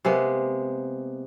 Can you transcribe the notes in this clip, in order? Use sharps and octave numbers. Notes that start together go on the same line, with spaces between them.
C3 G#3 A#3 B3